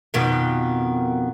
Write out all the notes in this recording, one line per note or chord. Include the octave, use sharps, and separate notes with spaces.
F2 B2 D#3